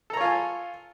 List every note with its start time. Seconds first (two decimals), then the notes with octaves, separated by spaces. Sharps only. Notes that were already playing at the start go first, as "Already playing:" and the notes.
0.10 A4
0.13 A#5
0.17 C#5
0.21 F4
0.24 G#5